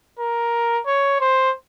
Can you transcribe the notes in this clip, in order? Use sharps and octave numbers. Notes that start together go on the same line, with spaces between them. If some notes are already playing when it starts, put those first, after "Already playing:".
A#4
C#5
C5